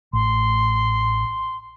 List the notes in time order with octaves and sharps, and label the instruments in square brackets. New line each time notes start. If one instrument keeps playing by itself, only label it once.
[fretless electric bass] A1 [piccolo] C6